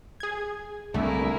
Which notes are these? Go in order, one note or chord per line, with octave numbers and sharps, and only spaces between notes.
G#4 G#6
C2 D3 A3 A#3 E4 G#4